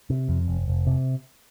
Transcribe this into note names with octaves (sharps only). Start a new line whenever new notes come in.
C3
F2
F1
F1
C3